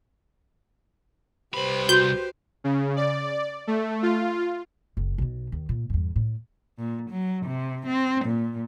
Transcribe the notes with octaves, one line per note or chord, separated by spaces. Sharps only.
C2 G4 B4 C5 B5
F#4 C6 G6
C#3
D5
A3
F4
F#1
B1 B2
D#2
A#2
E2 G2
A2
A#2
F#3
C3
C4
A#2